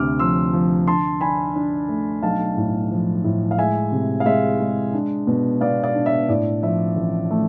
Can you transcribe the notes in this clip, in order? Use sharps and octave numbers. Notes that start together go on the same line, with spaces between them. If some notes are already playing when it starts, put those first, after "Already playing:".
Already playing: D2 C3 D6 F6
F3 C6 E6
F3
D3 A5 C6
D4 G#5 B5
D4
A3
B1 F5 A5
A2
F3
A2
F5
G#3 E5 G#5
C3
F5
G#3 E5
G#3
D4
B2
B3 D5 F5
D5 F5
D4
E5
A2 D5
F3 E5
A1
A3